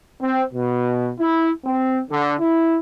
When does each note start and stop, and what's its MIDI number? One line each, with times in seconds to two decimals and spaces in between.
0.20 0.43 60
0.53 1.13 47
1.19 1.50 64
1.65 2.00 60
2.10 2.34 50
2.39 2.79 64